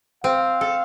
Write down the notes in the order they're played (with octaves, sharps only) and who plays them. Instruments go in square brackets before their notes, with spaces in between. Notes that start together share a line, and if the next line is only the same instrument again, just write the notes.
[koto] C4 [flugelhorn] F5
[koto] A4